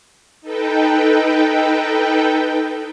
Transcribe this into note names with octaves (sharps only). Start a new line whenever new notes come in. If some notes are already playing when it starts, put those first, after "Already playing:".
D#4 A4 B4 G5